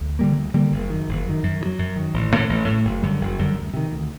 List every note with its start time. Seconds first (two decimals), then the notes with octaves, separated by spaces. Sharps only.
0.01 D2
0.19 D3 G3 A#3
0.37 D2
0.54 D3 G3 A#3
0.72 F#1
0.90 F#2 D#3
1.08 F#1
1.25 F#2 D#3
1.43 F#2
1.61 D#3
1.65 F#3
1.79 F#2
1.96 D#3 F#3
2.14 A1
2.32 A2 A3
2.49 A1
2.67 A2 A3
2.85 F#1
3.02 F#2 D3 G3
3.21 F#1
3.39 F#2 D3 G3
3.56 D2
3.74 C3 D#3
3.92 D2